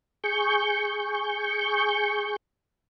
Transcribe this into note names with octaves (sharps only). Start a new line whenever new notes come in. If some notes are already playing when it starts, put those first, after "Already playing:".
G#4 C#6 G6